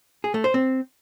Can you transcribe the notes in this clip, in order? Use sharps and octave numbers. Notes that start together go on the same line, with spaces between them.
G#4
A3
C5
C4